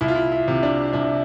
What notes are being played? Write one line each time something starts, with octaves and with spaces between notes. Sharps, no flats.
C2 E4
F4
E4
E4
C3
D4
C2 D4